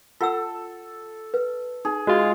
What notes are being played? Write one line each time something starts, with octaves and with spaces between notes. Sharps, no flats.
F4 A4 F#5 E6
B4
D#4 G#4
G#3 F4 F#4